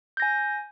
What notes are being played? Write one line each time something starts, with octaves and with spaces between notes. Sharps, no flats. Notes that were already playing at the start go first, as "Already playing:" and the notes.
G#5 G6 A#6